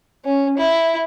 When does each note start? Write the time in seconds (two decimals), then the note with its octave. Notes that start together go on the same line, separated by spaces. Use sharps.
0.25 C#4
0.58 E4